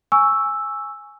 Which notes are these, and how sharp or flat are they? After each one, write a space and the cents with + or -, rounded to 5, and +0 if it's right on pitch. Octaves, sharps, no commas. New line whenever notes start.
G#5 +0 C#6 +10 E6 +0